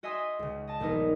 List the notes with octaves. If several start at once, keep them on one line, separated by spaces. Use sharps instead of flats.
F#4 D#5 E5 G#5 C6 D#6
C#2 C#3
D#5 A5
D#1 A#1 B3 D#4 A#4